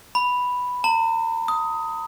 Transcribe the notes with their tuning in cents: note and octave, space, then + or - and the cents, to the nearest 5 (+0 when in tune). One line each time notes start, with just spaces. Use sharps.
B5 +0
A#5 -45
D#6 +15